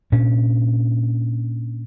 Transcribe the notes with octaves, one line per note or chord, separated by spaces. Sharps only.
A#2 C#4 D4